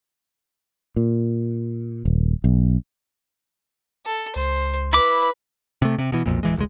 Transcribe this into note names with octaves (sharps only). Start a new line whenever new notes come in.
A#2
D#1
B1
A4
C#2 C5
E4 B4 B5 D6
C3 A3
C3
B2 E3
B1 F2 A#2
D1 E3 G#3
E1 C#2 G#3